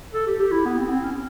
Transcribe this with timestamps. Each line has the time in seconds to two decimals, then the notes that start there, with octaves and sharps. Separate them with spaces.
0.14 A4
0.26 G4
0.39 G4
0.51 E4
0.65 B3
0.78 C4
0.90 C4
1.03 C#4